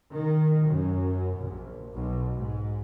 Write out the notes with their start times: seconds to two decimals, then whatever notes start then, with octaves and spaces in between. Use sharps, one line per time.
0.11 D#3
0.65 F#2
1.36 A#1
1.94 B1
2.35 G#2